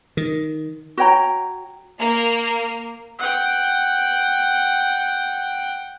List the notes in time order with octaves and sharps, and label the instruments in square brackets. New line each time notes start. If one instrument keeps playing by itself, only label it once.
[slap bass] D#3
[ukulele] F#4 C#5 G5 A#5
[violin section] A#3
[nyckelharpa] F#5 G5